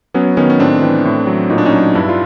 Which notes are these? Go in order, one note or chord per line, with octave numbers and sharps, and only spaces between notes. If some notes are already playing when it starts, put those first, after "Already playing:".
F#3 B3 C#4
D#3 B3 C#4
C#4
A2 C4 D4
E3
A2
F#3
A#2 D#4
D4
C#4 D#4
F#3
G2 D4 E4
F4